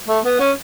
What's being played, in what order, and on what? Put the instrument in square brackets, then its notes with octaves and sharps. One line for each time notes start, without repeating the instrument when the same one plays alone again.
[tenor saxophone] A3
B3
C#4